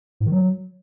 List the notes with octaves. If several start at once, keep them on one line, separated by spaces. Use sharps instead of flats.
G#2
D#3
F#3